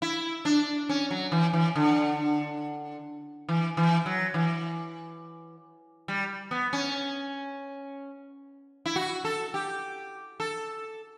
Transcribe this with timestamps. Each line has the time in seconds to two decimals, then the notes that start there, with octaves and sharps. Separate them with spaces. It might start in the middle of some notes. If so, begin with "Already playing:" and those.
0.02 E4
0.45 D4
0.89 C#4
1.11 F#3
1.32 E3
1.53 E3
1.76 D3
3.49 E3
3.77 E3
4.06 F#3
4.34 E3
6.08 G3
6.51 B3
6.73 C#4
8.86 E4
8.96 F#4
9.25 A4
9.54 G4
10.40 A4